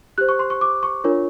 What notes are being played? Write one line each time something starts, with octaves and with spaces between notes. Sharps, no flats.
G4 C5 F#6
C#6
C6
C#6
D6
C#6
D4 F4 A#4 C#5